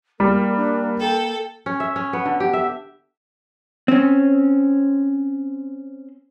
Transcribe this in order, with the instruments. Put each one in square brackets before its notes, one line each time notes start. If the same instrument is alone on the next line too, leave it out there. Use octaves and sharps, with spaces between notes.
[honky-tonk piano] G3 [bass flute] A#3 [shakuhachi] A#4
[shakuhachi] D4
[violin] A4 [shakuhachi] G5
[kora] C#4
E5
C#4
B3
D3
G4
E5
[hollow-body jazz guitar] C4 C#4